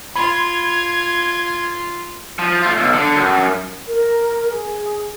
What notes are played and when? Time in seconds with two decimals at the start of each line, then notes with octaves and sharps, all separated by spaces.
0.16 F4 B5 C6 G#6
2.39 F3
2.62 A3 F4
2.78 B1
2.93 D3
3.16 F#2
3.87 A#4
4.49 G#4